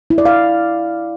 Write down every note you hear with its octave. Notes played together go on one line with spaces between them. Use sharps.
E4
D5
F5